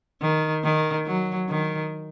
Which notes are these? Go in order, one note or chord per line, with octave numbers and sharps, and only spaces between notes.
D#3
D#3
F#3
D#3